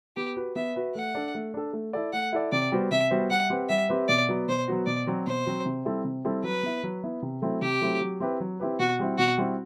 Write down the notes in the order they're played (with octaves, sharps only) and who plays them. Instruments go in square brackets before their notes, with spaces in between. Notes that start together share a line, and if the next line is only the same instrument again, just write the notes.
[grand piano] B3 [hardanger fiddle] G4
[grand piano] F#4 B4
[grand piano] B3 [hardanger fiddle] E5
[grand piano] F#4 B4
[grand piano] A3 [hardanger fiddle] F#5
[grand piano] D4 A4
A3
D4 A4
A3
E4 A4 D5
[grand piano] A3 [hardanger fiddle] F#5
[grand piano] E4 A4 D5
[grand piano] C3 [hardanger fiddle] D5
[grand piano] G3 B3 F#4 C5
[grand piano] C3 [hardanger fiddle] E5
[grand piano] G3 B3 F#4 C5
[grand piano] G3 [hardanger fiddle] F#5
[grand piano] C4 G4 B4
[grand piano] G3 [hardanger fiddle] E5
[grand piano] C4 G4 B4
[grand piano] B2 [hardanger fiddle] D5
[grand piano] F#3 B3 F#4
[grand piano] B2 [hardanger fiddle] C5
[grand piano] F#3 B3 F#4
[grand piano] B2 [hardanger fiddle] D5
[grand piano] F#3 C4 F#4
[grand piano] B2 [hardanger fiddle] C5
[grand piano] F#3 C4 F#4
C3
G3 C4 E4 A4
C3
G3 C4 E4 A4
[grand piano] F#3 [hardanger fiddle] B4
[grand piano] B3 E4
F#3
B3 E4
C3
F#3 A3 C4 E4
[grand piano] C3 [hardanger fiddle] G4
[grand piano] F#3 A3 C4 E4
F#3
C4 E4 G4 B4
F#3
C4 E4 G4 B4
[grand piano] B2 [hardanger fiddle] F#4
[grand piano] G3 C4 E4
[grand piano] B2 [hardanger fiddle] F#4
[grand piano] G3 C4 E4